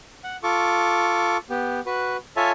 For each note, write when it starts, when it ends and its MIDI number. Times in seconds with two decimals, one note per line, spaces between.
0.24 0.37 78
0.43 1.37 65
0.43 1.37 69
0.43 1.37 85
0.43 1.37 86
1.50 1.80 59
1.50 1.80 67
1.86 2.17 66
1.86 2.17 71
2.37 2.52 65
2.37 2.52 69
2.37 2.52 73
2.37 2.52 76
2.37 2.52 80
2.37 2.52 81